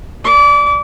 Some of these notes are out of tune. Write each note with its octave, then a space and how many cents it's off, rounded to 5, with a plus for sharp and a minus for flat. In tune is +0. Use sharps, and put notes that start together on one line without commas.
D5 +0 D6 -30